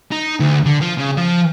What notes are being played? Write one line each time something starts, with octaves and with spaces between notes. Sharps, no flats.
D#4
D2
D3
F3
C#3
F3